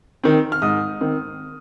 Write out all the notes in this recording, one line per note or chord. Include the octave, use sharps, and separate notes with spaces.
D#3 C4
F6
G#2 D#6
D#3 C4